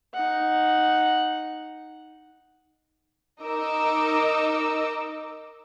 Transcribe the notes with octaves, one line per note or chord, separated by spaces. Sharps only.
D#4 F#5
D#4 A#4 D#5 D6 E6